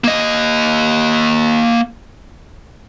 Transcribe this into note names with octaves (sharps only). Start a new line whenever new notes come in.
A#3 D#5